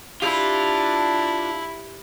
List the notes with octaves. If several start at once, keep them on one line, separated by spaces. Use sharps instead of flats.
D4 E4 F4 G4